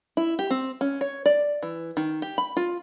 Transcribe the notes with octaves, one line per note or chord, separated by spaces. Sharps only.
E4
G4
C4
C#4
C#5
D5
E3
D#3
G4
B5
F4